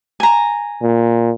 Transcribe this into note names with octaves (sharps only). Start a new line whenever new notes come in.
G#5 A#5
A#2